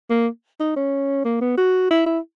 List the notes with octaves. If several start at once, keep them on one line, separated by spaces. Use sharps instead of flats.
A#3
D#4
C#4
A#3
B3
F#4
E4
E4